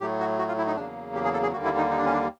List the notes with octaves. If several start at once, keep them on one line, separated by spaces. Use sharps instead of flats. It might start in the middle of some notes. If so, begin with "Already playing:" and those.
A2 F#3 A3 G4
F#4
F#4
F4
E4
D#4
E2 C#3 F#3 A#3 D4
G4
G#4
A4
G#4
D#2 D3 G3 A#3 F#4
E4
D#4
D#4
D4
C#4
D4